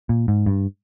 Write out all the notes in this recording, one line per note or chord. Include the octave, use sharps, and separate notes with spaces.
A#2
G#2
G2